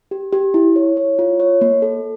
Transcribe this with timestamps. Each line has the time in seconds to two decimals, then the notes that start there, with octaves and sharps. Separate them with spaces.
0.11 G4
0.33 G4
0.54 E4
0.76 C#5
0.97 C#5
1.19 F4
1.40 C#5
1.61 A#3
1.82 A4